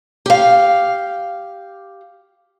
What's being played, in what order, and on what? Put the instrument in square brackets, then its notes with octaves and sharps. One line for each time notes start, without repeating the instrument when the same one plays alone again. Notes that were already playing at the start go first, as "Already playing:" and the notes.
[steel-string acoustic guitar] G4 F5